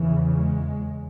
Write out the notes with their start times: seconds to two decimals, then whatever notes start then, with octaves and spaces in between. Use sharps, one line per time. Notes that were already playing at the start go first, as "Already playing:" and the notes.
Already playing: E2 C#3 E3
0.38 G#3